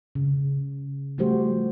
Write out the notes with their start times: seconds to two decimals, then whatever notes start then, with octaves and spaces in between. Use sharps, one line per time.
0.15 C#3
1.18 F3 G3 A3 F#4 G4 C5